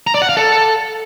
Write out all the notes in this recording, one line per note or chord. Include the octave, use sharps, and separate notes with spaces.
A#5
D5
F#5
F5
A4